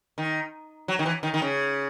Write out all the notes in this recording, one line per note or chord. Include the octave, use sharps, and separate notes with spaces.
D#3
F#3
D#3
E3
D#3
D#3
C#3